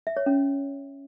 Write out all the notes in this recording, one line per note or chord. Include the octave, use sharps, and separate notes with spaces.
E5
C#5
C#4